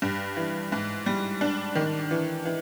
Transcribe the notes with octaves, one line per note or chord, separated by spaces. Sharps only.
G2
E3
G#2
G3
D4
D#3
E3
E3